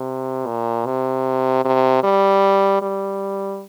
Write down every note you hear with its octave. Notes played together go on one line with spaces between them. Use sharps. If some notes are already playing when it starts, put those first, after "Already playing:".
Already playing: C3
A#2
C3
C3
G3
G3